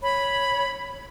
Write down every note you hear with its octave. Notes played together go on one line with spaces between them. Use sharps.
C#5 B5